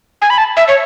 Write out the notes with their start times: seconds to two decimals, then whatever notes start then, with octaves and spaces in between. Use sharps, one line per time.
0.22 G#5
0.30 B5
0.38 A5
0.57 E5
0.68 C#5